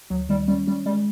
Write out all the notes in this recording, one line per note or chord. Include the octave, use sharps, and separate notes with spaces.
D2 F#3
D#3 G3
G3 C#4
G3 C#4
G3 G#3